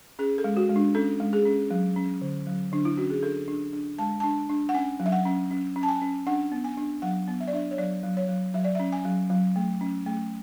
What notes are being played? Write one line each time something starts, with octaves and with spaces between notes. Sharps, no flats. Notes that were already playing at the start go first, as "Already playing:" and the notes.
C#4 G#4
A4
G#3
F#4
G#3
D4
C#4 A4
G#3
G#4
C#4
F#3
C#4
D3
F#3
D3 D4
E4
C#4 F#4
G#4
D4 A4
D4
D4
G#3 A5
D4 A5
D4
F#5
C#4 G#5
F#3
E5
F#5
C#4
C#4
C#4
A5
G#5
C#4
D4 F#5
B3
G#5
D4
F#3 F#5
B3
E5
D5
D4 E5
C#5
F#3 D5
F#3
C#5
F#3
F#3 E5
D5
C#4 E5
G#5
F#3
F#3
A3
C#4
A3